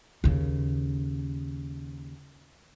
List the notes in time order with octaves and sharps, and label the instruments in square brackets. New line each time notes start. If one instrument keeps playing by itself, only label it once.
[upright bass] D#2 C#3